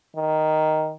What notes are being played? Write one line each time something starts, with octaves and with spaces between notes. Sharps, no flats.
D#3